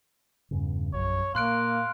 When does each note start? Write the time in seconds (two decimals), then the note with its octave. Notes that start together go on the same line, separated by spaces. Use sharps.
0.51 E2 G2 C#3
0.94 A#1 F#2 C#5
1.35 A#2 A#3 F5 C6 F#6 D7